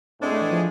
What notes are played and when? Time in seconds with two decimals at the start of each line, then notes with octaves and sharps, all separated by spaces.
0.21 A2 G#3 C4 D4 G#4
0.31 A3
0.41 E3
0.51 F3